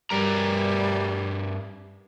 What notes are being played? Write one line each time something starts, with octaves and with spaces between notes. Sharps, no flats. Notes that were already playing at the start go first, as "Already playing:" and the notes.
G2 G3 A#4 A#5